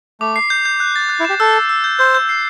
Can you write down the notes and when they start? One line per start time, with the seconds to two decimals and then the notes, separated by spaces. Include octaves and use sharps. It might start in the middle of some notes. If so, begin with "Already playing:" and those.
0.21 A3 D6
0.36 C7
0.50 G6
0.65 G6
0.80 F#6
0.96 A6
1.09 F#6
1.20 E4
1.25 G4 E7
1.40 A4 E6
1.54 E6
1.69 E6
1.84 G6
1.99 C5 G6
2.15 G6
2.29 C7